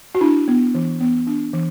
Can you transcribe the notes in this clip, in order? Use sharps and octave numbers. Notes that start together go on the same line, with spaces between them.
F#4
D4 E4
B3
E3
B3
D4
E3